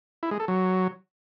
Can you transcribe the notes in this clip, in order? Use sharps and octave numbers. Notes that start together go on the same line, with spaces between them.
E4
G#3
A4
F#3